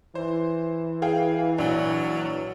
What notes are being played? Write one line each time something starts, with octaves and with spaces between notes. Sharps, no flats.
E3 C5
G#4 F5 G5
A#1 F#3